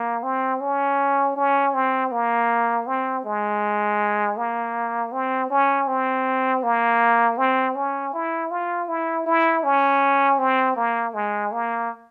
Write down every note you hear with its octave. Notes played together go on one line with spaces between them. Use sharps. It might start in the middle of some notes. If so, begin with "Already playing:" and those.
Already playing: A#3
C4
C#4
C#4
C4
A#3
C4
G#3
A#3
C4
C#4
C4
A#3
C4
C#4
E4
F4
E4
E4
C#4
C4
A#3
G#3
A#3